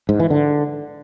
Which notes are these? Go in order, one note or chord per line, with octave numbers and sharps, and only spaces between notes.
G#2
E3
D3